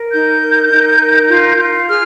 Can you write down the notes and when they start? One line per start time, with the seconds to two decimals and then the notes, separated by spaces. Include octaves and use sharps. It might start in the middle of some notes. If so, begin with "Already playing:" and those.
Already playing: A#4
0.11 D#4 G6
0.41 A#4
0.70 D#4
1.00 A#4
1.29 F4
1.58 F4
1.87 G#4 F6